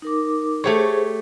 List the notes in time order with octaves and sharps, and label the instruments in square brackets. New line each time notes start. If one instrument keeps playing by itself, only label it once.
[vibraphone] D#4 A#4 D6
[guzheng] A3 G4 C#5 [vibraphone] G#4 C5